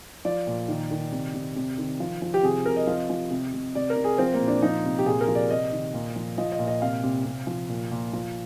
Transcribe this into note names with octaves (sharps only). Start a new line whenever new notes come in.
F3 D5
A#2
D#3
D#3
C3
C3
C3
D#3
F3
F3
G4
C3 G#4
C3 A#4
D#5
F3
F3
C3
C3
C3 D5
A#4
C3
G#4
F3 C4
A#3
A#2
D4
F3 D#4
C3
G4
A#2 G#4
A#4
F3
D5
C3 D#5
D#3
A#2
F3
F3 D#5
D#5
A#2
D#5
C3 F5
C3
C3
F3
A#2
A#2
F3